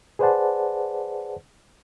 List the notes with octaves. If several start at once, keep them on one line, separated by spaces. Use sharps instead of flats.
G#4 B4 C5 D5 F#5 A5